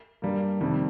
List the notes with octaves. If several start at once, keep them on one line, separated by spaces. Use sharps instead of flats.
G2 G3 A#3
F2 C3 D#3 G3